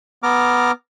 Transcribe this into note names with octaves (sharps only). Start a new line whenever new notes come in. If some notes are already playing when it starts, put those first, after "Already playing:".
B3 A#5 D6 F6